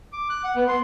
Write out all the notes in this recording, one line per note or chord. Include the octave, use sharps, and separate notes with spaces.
D6
F#6
F#5
B3
C6